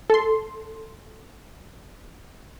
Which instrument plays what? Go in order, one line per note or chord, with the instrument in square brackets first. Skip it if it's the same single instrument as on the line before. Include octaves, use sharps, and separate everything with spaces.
[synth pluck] A4 C6